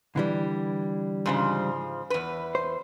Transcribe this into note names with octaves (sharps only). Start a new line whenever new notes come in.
D3 E3 G3
G#2 C#3 F3
E2 B4
C5